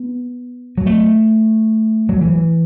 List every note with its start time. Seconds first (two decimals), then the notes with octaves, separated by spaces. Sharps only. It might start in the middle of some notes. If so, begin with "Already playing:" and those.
Already playing: B3
0.78 F#3
0.86 A3
2.09 F#3
2.21 E3